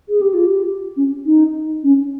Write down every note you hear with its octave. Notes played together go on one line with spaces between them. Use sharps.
G#4
G4
F4
G4
C#4
D#4
C#4